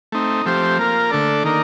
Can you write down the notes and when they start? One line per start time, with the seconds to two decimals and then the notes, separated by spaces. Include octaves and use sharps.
0.12 A3 C4 D#4
0.45 F3 A3 C4 G4 C5
0.79 A#3 F4 A#4
1.10 D3 A3 D4 A4 D5
1.44 D#3 A#3 D#4 A#4 D5